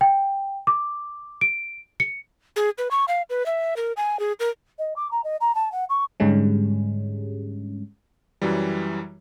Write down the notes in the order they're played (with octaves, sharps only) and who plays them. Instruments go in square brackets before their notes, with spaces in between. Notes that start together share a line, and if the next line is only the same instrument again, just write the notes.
[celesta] G5
D6
D7
C#7
[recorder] G#4
B4
C#6
F5
B4
E5
A#4
G#5
G#4
A#4
[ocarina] D#5
D6
A#5
D#5
A#5
A5
F#5
C#6
[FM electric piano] G#2 D3 G3 G#3 C#4
[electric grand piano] F#2 E3 F#3 G3